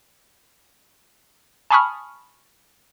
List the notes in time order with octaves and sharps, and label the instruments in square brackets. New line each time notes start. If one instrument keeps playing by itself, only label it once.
[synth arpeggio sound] G#5 A5 B5 C#6 D#6 F6